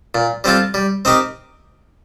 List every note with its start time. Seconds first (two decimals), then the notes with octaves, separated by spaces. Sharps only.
0.15 A#2
0.44 G3 C4 F4 A4
0.74 G3
1.05 C4 D#4 G4 A#4